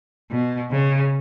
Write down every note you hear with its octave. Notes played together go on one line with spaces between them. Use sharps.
B2
C#3